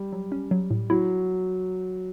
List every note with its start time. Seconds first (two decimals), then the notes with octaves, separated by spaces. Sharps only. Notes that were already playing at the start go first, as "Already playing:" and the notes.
Already playing: G3
0.13 F#3
0.32 C#4
0.51 F#3
0.71 A2
0.90 F#3 E4